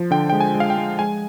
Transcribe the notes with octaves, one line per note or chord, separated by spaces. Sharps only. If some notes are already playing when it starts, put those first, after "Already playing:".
Already playing: F3
D3 G5
G#3 G5
G#5
G#3
F5
G5
G#3
G#3 G#5